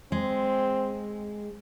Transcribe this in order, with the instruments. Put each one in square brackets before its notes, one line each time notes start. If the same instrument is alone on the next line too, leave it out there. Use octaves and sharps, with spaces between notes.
[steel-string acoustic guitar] G#3 [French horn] C4